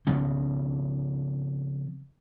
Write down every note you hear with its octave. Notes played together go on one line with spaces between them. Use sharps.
C#3 F3 B3 C4